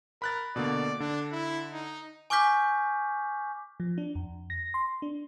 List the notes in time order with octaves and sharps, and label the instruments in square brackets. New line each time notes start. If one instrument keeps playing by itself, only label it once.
[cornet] A#4 [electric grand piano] B5 F#6 A6
[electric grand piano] B2 D3 A#3 [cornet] D5
[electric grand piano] D3 [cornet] D4
[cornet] E4
D#4
[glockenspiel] G#5 C#6 D6 F6 G6 B6
[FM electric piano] F3
D4
F2
A#6
C6
D4